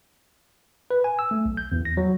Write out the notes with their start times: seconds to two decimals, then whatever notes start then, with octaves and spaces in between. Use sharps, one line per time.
0.91 B4
1.04 G#5
1.19 E6
1.31 A3
1.45 B1
1.57 G6
1.72 E2
1.85 A#6
1.97 F#3